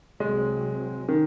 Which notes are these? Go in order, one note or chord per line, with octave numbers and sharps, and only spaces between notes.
C2 C3 F#3 G#3 C4
D#3